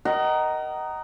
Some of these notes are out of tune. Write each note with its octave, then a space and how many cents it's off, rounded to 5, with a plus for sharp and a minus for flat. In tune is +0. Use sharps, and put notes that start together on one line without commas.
A#4 +0 D#5 +0 F#5 +35